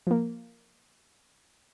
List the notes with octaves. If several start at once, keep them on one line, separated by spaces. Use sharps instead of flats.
F3 A#3